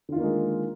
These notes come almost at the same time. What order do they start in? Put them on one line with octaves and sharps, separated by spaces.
D3 F4 D#3 A#3 G#3